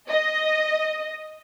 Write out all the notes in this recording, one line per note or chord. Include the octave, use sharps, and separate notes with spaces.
D#5